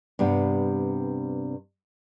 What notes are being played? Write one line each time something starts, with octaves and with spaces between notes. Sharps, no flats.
G2 C3 B3